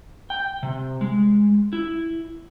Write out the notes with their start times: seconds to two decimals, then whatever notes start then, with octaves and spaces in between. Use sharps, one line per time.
0.30 G5
0.63 C3
1.01 G#3
1.73 E4